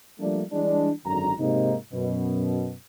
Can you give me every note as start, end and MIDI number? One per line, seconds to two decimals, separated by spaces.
0.20 0.43 53
0.20 0.43 55
0.20 0.43 57
0.20 0.43 58
0.20 0.43 62
0.52 0.90 52
0.52 0.90 55
0.52 0.90 56
0.52 0.90 62
1.06 1.32 32
1.06 1.32 42
1.06 1.32 50
1.06 1.32 82
1.39 1.75 44
1.39 1.75 48
1.39 1.75 56
1.39 1.75 58
1.39 1.75 63
1.93 2.74 42
1.93 2.74 47